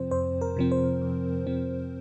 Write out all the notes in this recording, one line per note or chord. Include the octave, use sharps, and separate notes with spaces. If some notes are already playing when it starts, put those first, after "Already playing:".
Already playing: F2 C3 F3 C4 C5
F2 C5
A#4
C3 F3 C4
C5
F2
C3 F3 C4